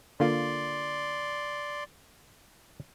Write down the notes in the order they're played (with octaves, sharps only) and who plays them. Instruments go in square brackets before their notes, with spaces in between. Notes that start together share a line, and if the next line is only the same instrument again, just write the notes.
[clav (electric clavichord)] D3 A#3 F4 [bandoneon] D5 C6